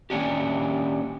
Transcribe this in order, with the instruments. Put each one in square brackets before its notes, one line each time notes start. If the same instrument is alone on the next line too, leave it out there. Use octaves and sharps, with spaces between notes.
[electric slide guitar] D#3 A#3 C#4 D4 G4